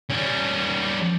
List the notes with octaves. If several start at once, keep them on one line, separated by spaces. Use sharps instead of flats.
G3 C#4